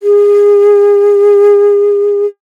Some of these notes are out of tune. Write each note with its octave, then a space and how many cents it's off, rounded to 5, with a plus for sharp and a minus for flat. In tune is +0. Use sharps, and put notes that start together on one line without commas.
G#4 -30